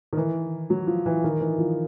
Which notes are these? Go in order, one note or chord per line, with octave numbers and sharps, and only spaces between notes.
D#3
E3
F#3
F3
E3
D#3
E3
F3